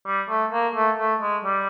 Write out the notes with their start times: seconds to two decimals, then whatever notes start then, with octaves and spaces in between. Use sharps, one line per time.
0.06 G3
0.29 A3
0.52 A#3
0.75 A3
0.98 A3
1.21 G#3
1.45 G3